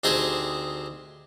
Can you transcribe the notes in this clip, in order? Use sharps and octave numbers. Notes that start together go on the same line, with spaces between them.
D2 C4 D#4 G4 G#4 C5